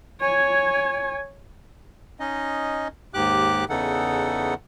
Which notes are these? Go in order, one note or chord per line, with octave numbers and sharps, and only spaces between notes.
C#5 G#5
C#4 D#4 D#5
D#2 G#2 G4 D6 F#6
E2 C#3 E3 D#4 A4 F#5